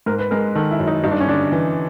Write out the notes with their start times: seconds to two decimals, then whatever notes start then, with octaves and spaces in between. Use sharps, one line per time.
0.06 G#2 A#4
0.19 B4
0.31 G#3 A#4
0.55 D#3 A4
0.71 E4
0.80 F#2
0.87 D#4
1.04 G2 D#4
1.11 D4
1.20 C#4
1.27 D3 D4
1.52 E3